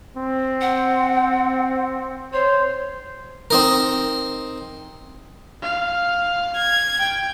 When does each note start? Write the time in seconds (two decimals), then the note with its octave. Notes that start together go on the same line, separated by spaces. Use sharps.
0.17 C4
0.61 F#5
2.33 C5 C#5
3.51 C4 D#4 A#4
5.62 F5
6.57 G#6
6.99 G5